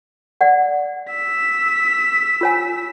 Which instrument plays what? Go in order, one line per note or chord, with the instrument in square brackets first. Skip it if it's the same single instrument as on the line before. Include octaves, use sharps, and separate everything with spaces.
[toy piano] D5 F#5
[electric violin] E6 B6
[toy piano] F4 C#5 G#5